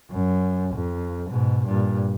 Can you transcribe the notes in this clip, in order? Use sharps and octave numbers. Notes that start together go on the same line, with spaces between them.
F#2
F2
G#2 B2
G2 A#2